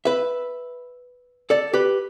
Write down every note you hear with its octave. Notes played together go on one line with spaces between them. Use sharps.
B4 E5
A4 D5
G4 B4